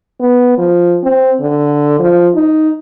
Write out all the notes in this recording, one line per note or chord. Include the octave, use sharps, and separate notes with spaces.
B3
F3
C4
D3
F3
D#4